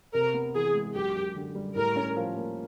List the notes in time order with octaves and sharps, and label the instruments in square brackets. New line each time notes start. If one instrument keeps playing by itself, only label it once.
[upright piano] C3 [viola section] A#4
[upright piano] B3
[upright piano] E3 [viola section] G#4
[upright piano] G#3
[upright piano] F#2 [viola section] G4
[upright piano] F#2
D3
G3
[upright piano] A2 [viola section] A#4
[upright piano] C#4
F3
A#3